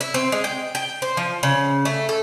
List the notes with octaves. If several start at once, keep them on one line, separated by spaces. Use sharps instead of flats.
E4
C4
G#3
G5
G5
C5
F3
C#3
A3
A4